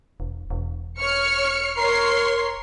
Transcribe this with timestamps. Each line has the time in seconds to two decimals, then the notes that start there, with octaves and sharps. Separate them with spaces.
0.20 E1
0.51 E1
1.00 C#5 F6 C#7
1.77 A#4 C#5 C6 C7